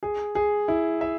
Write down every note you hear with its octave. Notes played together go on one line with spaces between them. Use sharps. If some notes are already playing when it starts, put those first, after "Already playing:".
G#4
G#4
E4
E5